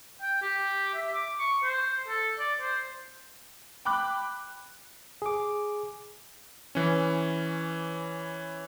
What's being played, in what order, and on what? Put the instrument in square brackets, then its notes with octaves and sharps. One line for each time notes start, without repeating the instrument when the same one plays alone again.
[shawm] G5
G4
E5
D6
C#6
C5
A4
D5
C5
[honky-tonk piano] G5 B5 D6 F#6
[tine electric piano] G#4 D6
[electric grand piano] E3 C#4